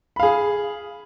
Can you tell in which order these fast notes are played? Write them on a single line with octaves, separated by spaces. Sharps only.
B5 F5 G#4